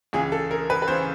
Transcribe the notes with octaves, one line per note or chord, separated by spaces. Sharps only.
C#2 C#3 E3 G#4
A4
A#4
B4
B4
C#3 E3 C5